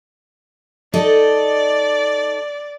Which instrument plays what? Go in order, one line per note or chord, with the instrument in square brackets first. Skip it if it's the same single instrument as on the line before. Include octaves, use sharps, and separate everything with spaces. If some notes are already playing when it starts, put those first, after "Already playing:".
[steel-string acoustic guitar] D#4 A4 D#5 [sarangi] D5